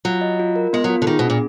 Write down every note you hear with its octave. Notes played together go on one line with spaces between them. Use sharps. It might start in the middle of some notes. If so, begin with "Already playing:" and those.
F#3 F4
D#5
F4
A#4
G#3 B3
F#3
F4
D3
D#3 G#4
B2
A#2 D4